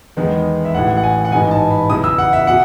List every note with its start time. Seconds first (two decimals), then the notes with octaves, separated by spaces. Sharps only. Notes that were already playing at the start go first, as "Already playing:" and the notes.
0.17 E2 D#3 G#3 B3 D#4
0.65 E5
0.74 A1 A2 E3 F#5
0.97 F#5
1.03 G#5
1.25 F#5
1.32 A1 G#2 E3 B3 D#4 G#5
1.51 A5
1.70 B5
1.90 E2 C#3 E3 D#6
2.04 E6
2.18 F#5
2.33 E5
2.47 B2 F#5